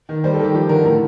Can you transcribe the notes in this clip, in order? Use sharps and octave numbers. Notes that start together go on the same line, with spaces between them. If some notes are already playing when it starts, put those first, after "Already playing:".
D#3
G3 C5
A4
D#3 G4
F3 G4
D3 A#4
A2 A#4